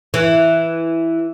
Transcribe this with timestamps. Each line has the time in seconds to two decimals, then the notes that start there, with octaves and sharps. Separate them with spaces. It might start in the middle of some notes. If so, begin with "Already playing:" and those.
0.14 E3